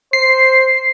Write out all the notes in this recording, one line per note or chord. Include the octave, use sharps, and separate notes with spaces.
C5 C7